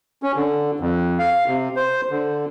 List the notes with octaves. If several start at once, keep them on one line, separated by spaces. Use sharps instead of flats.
C#4
D3
F2
F5
C3
C5
D3